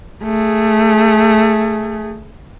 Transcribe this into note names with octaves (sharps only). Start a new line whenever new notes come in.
A3 G#4